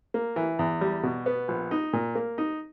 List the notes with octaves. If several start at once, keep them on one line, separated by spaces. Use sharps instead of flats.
A#3
E3
E2
G3
B2
B3
A#1
D#4
A#2
A#3
D#4